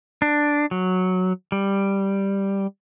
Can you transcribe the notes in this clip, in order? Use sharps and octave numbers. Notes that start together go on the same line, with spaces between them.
D4
F#3
G3